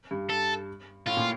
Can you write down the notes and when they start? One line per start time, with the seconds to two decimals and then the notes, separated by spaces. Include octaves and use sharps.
0.11 G2
0.30 A4
1.06 A2 F4
1.17 A#2